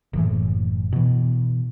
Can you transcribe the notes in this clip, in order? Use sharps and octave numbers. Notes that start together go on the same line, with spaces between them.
F#1 A2 E3
B2 E3